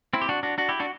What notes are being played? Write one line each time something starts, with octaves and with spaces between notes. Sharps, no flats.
C4 E4
G4
D4 F#4
D4 F#4
D4 F#4
E4 G4
D4 F#4